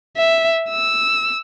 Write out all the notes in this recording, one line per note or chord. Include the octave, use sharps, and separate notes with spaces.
E5
E6